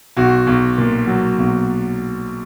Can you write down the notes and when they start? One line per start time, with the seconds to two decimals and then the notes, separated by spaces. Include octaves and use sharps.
0.17 B1 F#4
0.47 B1
0.78 A#2
1.07 F#3
1.38 B1